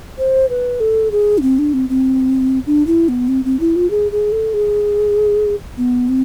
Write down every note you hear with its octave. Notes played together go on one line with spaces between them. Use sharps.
C5
B4
A4
G#4
D4
C4
D4
C4
C4
D4
E4
B3
C4
C4
E4
F4
G#4
G#4
A4
G#4
B3
C4